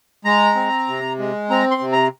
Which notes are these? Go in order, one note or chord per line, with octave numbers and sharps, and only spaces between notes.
G#3 A#5
C4
C3
G#3
C4 A#5
C6
C3
A#5